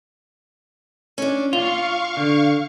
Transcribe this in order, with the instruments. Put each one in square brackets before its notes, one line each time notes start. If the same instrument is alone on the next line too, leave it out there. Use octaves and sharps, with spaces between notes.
[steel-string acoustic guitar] C#4 D4
[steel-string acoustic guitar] A#2 [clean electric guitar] F4 [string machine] F5 C#6
[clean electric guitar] D3